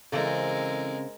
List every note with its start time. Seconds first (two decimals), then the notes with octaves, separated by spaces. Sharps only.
0.12 C#3 E3 G#3 C4 A4 A#4